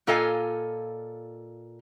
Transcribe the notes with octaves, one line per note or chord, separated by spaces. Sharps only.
A#2 F4 A4 D#5 F5 G#5